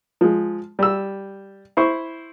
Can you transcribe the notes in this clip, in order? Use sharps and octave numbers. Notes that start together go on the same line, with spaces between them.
F3 G#3
G3 E6
E4 C5 C#6